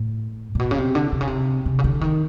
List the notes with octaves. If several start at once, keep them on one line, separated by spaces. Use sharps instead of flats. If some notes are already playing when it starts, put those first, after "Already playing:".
Already playing: A2
A#2
B2
C#3
C3
D3
C3
C#3
C3
C3
C#3
D3
D#3